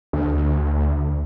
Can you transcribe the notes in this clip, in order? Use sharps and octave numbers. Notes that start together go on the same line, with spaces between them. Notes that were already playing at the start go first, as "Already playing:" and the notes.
D2